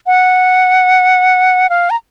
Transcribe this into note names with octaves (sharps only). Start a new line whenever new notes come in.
F#5
F5
A#5